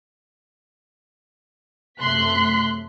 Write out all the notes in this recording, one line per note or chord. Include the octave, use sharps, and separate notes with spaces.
F#2 C3 A3 C6 F#6 B6